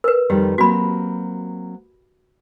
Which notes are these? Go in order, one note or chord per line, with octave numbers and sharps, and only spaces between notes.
A#4 B4
F2 D#3 G3 G4
F#3 A#3 C4 F#4 B5